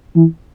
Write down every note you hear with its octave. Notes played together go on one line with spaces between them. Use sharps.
E3